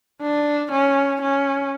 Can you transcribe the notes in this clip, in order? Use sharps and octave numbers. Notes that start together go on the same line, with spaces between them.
D4
C#4
C#4